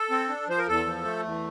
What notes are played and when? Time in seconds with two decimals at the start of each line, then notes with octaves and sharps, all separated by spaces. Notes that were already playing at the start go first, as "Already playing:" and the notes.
Already playing: A4
0.10 C4
0.29 D4
0.48 F3 C5
0.58 A#4
0.67 E2 A4
0.86 F3
1.05 A3
1.24 E2